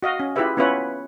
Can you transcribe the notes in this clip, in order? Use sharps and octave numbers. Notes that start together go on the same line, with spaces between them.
F#4 D#5 F5
C#4
E4 F4 G4 G#4 B4 E5
B3 C#4 E4 F4 B4 C#5